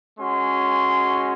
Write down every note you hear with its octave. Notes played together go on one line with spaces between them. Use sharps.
G#3 C#4 F#4 C6